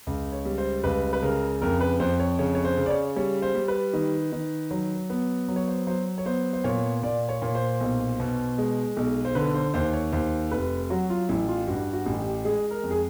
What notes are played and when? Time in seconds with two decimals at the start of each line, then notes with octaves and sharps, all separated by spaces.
0.07 C#2
0.32 C#5
0.45 G3
0.58 C5
0.84 C#2 B4
1.13 B4
1.23 C#3 A#4
1.62 F2 A#4
1.81 B4
2.00 F2 C5
2.20 C#5
2.39 C#3 C#5
2.55 C#5
2.64 C5
2.77 C#3
2.86 D5
2.90 C#5
3.16 G3 C#5
3.42 C5
3.55 G3
3.68 B4
3.94 D#3
4.32 D#3
4.71 F#3
5.10 B3
5.48 F#3
5.56 C#5
5.68 C5
5.87 F#3 C5
6.18 C#5
6.25 B3 C5
6.53 C5
6.64 A#2 C#5
7.03 A#2 D5
7.29 C#5
7.42 A#2 C#5
7.55 C5
7.81 B1
8.20 B2
8.58 G#3
8.97 B1
9.25 C5
9.35 D3 B4
9.54 C5
9.74 D#2 C5
9.93 C#5
10.13 D#2 C5
10.51 F1 B4
10.90 F#3 F#4
11.10 F4
11.29 A1 E4
11.48 F4
11.67 G2 F#4
11.93 F#4
12.06 A1
12.19 G4
12.45 G#3 G#4
12.71 A#4
12.83 F2
12.91 G#4